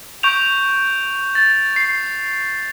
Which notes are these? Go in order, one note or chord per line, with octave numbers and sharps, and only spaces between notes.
C#6 G6 D7 F7
A6
C7